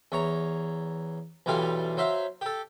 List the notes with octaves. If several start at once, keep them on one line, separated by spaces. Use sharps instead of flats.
E2 C#5 A#5
B1 E3 G3 F4 A4 F5
F#3 C5 E5 F5
G4 A4